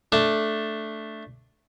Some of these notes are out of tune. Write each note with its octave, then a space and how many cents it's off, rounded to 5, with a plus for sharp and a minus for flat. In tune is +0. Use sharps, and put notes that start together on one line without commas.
A3 +0 D4 +0